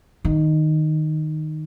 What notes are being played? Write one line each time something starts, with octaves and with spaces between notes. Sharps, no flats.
D#3